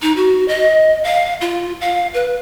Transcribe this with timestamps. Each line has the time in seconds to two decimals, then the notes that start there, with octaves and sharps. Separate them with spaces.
0.02 D#4
0.16 F#4
0.48 D#5
1.04 F5
1.41 F4
1.81 F5
2.14 B4